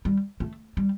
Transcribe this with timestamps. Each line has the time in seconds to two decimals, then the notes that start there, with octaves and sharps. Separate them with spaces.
0.05 G3
0.40 A3
0.77 G3